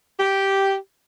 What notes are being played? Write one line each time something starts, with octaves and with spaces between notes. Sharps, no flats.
G4